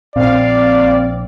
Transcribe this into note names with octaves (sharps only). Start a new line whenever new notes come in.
A#1 C4 D5 F5